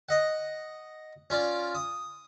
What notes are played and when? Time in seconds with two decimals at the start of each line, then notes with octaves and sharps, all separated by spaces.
0.09 D#5 F#5
1.30 C#4 F4 D5
1.75 D#6